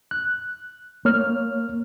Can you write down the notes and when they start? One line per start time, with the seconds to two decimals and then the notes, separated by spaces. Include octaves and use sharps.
0.11 F#6
1.05 A#3 C#5 F6